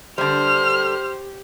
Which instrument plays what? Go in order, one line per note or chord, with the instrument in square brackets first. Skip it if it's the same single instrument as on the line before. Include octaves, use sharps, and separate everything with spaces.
[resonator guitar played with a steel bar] D3 G3 [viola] G4 [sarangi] C5 [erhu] F6